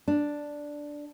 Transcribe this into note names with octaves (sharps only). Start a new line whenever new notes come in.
D4